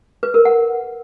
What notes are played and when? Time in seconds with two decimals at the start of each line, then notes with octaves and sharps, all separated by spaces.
0.23 B4
0.34 A#4
0.45 F#5